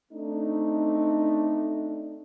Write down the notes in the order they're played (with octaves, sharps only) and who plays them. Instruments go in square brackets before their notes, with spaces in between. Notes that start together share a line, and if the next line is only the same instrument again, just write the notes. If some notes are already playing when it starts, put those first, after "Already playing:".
[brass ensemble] A3 C4 D4 D#4